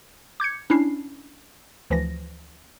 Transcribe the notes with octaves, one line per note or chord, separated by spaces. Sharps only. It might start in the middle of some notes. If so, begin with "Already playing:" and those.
D6 G6 G#6 C#7
C#4 D4 E4 C7
D2 E3 F3 A#6